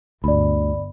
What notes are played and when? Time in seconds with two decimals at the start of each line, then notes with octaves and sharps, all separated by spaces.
0.24 G1 D2 D5 B5